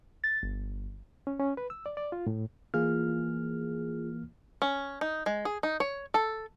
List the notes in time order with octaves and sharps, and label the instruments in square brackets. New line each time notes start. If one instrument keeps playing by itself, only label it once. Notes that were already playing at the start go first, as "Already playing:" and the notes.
[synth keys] A6
G1
[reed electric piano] C#4
C#4
B4
E6
D5
D5
F4
A2
[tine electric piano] E3 A#3 F6 [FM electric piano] F4 G#4
[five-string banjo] C#4
D#4
G#3
G#4
D#4
C#5
A4